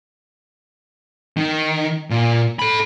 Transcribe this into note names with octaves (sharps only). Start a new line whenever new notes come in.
D#3
A#2
A4 B5